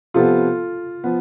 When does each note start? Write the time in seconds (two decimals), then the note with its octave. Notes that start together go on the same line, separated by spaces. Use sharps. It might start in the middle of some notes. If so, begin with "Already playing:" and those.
0.14 C3 F3 B3 F4 A4
1.04 F3 B3